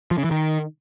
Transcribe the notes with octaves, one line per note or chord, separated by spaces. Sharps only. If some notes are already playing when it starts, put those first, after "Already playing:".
F3
C#3
E3
D#3